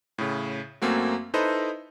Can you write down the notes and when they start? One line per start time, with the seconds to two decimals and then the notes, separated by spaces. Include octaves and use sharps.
0.18 A2 C#3
0.82 F#2 A3 A#3 C4 F#4
1.34 D#4 E4 A4 B4 C5 D#5